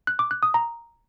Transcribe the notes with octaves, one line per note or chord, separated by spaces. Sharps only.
F#6
D6
F#6
D#6
A#5